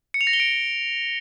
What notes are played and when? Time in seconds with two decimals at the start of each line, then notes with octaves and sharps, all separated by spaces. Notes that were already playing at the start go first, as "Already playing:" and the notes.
0.14 C#7
0.21 F7
0.27 A#6
0.33 G7
0.40 D7